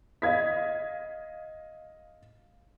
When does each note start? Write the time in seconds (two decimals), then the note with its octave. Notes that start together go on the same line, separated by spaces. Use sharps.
0.22 D#5 F5 G#6 B6